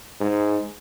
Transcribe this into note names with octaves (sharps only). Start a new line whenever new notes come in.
G#2